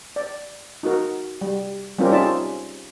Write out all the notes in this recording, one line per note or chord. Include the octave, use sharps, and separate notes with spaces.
D5
D#4 F#4 A#4
G3
G3 C4 C#4 F4 G4 A#4
C#4 D#4 F4 D5 E5 A5